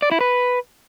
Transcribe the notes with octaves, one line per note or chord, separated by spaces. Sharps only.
D5
E4
B4